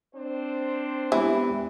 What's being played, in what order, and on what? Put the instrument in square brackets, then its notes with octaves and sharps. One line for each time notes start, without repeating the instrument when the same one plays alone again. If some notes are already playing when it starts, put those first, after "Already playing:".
[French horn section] C4 D4 C5
[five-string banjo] E3 [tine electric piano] G#3 B3 G4 [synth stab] E4